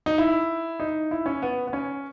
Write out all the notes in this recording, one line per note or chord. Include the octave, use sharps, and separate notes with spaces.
D#4
E4
D#4
E4
C#4
B3
B3
C#4